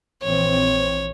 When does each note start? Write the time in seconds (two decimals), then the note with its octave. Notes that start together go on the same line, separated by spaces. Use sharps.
0.23 A#1 E3 C4 C#5